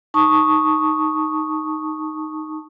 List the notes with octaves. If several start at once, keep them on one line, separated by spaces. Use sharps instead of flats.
D#4 A5 C#6 D#6